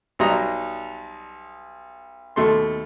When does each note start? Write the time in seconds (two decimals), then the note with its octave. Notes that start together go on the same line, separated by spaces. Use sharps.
0.19 B1 F#3 G3 D#5 A#5
2.36 D#2 B2 A3 A4 C6